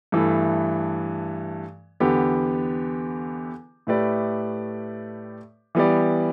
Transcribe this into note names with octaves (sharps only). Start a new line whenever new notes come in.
G2 E3 A3
E2 D3 B3 G4
A2 A3 G4 B4 D5
E3 G3 B3 G4 D5